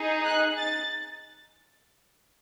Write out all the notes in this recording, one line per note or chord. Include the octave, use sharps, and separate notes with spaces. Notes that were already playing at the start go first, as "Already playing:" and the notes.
Already playing: D#4 G#4
F#6
A6